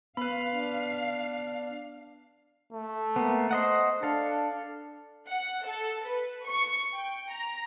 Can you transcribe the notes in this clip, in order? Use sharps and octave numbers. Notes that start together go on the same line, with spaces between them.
B3 B4 F5 B5
D4
A3
A#3 B3
C5 D#5 F#5
D4 A4 F5
F#5
A4
B4
C#6
G5
A#5